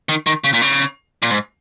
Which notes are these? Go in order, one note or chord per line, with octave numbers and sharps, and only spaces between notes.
D#3
D#3
C#3
A#2
C#3
A#2
G#2